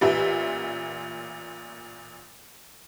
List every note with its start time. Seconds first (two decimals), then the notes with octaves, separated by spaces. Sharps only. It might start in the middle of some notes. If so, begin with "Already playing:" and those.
0.01 A1 A#2 G4 B4 E5